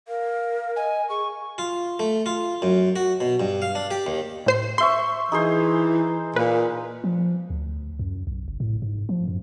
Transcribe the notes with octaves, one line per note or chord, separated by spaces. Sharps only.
A#4 F5
D#5 G#5
G#4 C#6
F4
A3
F4
F#2
F#4
B2
G2
F5
D4
G4
D#2
A2 C5 C7
C5 E5 C6 C#6
E3 D#4 G#4 C5
A#2 B4
F3
D2
F#2
B1
F#1
A2
G#2
F3
F#2